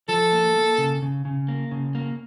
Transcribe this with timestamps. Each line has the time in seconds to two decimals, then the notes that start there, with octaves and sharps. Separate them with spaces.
0.09 F3 A4
0.32 A#3
0.56 A#3
0.78 C#3
1.02 C#3
1.25 C#3
1.48 A#3
1.71 C#3
1.95 A#3